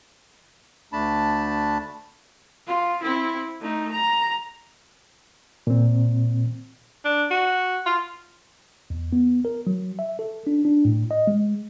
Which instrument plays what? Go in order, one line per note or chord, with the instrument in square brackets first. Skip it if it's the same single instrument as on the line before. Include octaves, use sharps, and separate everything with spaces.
[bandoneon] D2 A3 D4 A5 B5
[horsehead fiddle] F4
C4 E4
A3 D#4
A#5
[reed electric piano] A#2 C4
[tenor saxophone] D4
F#4
F4
[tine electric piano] E2
B3
A#4
F#3
E5
A4
D4
D4
A2
D#5
G#3